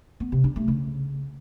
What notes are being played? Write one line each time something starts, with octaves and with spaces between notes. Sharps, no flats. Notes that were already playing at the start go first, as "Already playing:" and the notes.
B3
C3
D4
A3
C#3